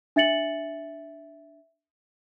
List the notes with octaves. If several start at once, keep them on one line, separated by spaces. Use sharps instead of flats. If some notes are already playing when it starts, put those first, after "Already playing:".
D4 E5 A6 C#7 F#7